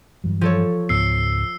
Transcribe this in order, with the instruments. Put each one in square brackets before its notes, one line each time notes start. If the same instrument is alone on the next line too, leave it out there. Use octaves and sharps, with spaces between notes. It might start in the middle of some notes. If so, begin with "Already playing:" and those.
[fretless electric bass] G2 E3 F#3
[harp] F3 A4 C#5
[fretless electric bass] C#2 G#2 B3 [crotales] E6 C7